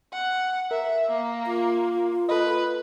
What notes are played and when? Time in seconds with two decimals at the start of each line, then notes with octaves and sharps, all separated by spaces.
0.13 F#5
0.71 A#4 E5
1.10 A#3
1.46 F4
2.29 A4 B4 D#5